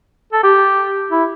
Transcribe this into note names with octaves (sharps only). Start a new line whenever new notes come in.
A4
G4
E4